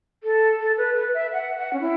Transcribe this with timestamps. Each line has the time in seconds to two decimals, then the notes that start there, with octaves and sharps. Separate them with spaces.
0.24 A4
0.60 A4
0.78 B4
0.96 B4
1.14 E5
1.33 F#5
1.57 F#5
1.73 C#4
1.81 E4